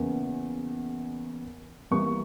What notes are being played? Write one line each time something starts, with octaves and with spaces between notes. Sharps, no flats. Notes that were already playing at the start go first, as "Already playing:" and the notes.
Already playing: E2 C#3 A#3
E2 E3 G3 A#3 C#6